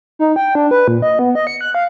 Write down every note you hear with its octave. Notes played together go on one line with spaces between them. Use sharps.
D#4
G5
D4
B4
A#2
D#5
B3
D#5
C#7
F#6
F5